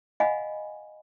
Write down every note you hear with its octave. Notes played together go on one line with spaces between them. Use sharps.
D#5 F5 F#5 G#5 B5